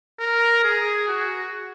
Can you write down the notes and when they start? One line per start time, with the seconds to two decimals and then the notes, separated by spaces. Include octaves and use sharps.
0.20 A#4
0.64 G#4
1.08 F#4